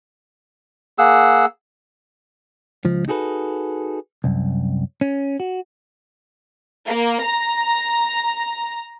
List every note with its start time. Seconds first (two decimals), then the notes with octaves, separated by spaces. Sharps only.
0.98 A#3 G#4 F#5 E6
2.85 C#2 F3
3.08 D#4 F#4 G#4 A4 B4
4.24 C2 F#2
5.01 C#4
5.40 F#4
6.86 A#3
7.22 A#5